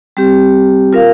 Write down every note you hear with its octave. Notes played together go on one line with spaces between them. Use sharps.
G3 C4 G4
F4 A#4 F5